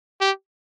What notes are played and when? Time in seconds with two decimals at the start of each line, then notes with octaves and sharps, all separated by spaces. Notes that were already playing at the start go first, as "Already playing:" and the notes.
0.21 G4